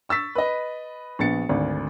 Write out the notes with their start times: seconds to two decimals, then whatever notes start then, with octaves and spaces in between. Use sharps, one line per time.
0.09 C#6 E6 A6 B6
0.35 B4 D#5
1.19 A#1 B3 A6 C#7
1.49 G#1 D2